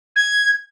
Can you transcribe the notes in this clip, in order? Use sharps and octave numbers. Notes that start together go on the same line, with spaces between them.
G#6